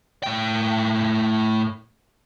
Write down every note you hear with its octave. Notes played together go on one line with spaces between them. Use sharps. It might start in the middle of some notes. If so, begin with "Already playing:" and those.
A2 G5